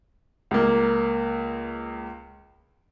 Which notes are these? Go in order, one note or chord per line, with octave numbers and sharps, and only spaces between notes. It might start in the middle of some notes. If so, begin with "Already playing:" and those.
C#2 A#3